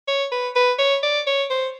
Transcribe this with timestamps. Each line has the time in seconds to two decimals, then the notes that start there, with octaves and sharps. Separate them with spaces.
0.08 C#5
0.32 B4
0.56 B4
0.79 C#5
1.03 D5
1.27 C#5
1.50 C5